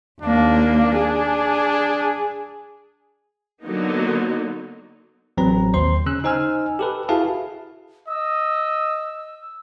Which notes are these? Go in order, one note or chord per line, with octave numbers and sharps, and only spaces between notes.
D#2 A#3 D4
G#4
D3 F#3 A#3 B3 D#4
A1 F#3 C4 B4 A#5
D#2 C5 C6
C#3 C#4 E6 F#6
D#4 C5 G#5 E6 F6
G4 A4 B4
E4 F#4 G#4 B4 F5 A5
D#5 E6